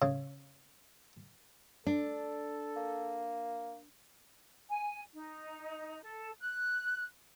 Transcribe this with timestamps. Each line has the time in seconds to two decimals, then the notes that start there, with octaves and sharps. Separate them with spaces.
0.02 C#3
1.87 D4 A4
2.76 A#3
4.69 G#5
5.14 D#4
6.03 A4
6.41 F#6